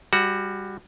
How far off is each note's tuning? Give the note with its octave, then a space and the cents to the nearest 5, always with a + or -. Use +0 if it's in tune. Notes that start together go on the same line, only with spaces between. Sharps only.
G3 +20 F#4 +0